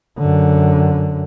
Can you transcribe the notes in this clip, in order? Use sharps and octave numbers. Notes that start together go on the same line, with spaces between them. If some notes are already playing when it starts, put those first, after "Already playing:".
F#2 D3